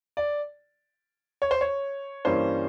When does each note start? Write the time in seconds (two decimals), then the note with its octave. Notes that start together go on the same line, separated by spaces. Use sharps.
0.17 D5
1.42 C#5
1.51 C5
1.61 C#5
2.25 G2 E3 G3 A#3 C#4 C5